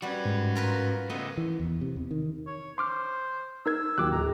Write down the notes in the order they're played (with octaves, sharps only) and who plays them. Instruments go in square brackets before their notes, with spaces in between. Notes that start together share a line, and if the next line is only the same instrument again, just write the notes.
[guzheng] G3 B4 [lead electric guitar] C#4 F#4
[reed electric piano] G#2
[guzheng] F4 A#4 B4
[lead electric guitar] C#3 A3 [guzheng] B3 D#5
[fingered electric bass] E3
E2
C3
E2
D#3
[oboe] C#5
[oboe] C5 [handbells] C6 D6 F6
[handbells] D#4 A#4 G#6 [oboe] E6
[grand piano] D#2 F#3 G5 [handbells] D6 F#6
[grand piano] D1 [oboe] A#5